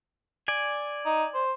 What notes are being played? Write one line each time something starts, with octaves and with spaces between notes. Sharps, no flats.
D5 G#5
D#4
C5